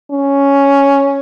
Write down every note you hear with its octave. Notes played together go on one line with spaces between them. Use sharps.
C#4